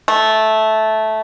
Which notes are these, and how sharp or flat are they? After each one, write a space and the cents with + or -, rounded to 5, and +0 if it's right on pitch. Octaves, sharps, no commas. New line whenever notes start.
A3 -10